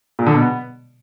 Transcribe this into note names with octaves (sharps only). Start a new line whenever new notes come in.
A#2
D3
B2
B3